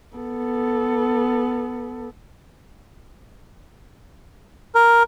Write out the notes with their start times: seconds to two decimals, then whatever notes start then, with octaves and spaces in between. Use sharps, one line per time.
0.16 B3 A4
4.75 A#4